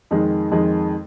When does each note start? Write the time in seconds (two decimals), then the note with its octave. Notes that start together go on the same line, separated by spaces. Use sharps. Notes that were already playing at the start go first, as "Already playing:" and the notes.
0.11 F2 D#3 G#3
0.51 F2 D#3 G#3